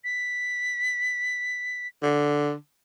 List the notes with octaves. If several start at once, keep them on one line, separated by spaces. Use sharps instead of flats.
B6
D3